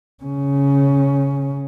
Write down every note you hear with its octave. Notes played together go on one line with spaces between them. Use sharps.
C#3 C#4